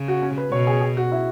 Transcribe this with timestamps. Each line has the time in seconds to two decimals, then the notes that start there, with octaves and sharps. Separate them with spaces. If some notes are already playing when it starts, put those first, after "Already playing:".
Already playing: C#3
0.08 F#4
0.22 C#4
0.37 B4
0.51 B2 C#5
0.67 G#4
0.81 G#4
0.97 F#4
1.12 E4